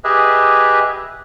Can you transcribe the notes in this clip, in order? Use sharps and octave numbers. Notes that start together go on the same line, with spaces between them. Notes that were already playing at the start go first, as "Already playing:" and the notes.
G4 G#4 B4 D#5 E5